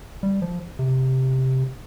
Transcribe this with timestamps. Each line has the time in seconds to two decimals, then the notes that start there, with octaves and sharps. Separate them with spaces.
0.23 G3
0.42 F3
0.79 C3